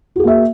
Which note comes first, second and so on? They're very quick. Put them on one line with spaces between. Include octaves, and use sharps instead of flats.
F#4 G#4 A#3 E5